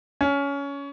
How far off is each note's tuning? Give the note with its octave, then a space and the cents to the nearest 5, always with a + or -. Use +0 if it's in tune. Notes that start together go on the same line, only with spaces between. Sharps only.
C#4 +20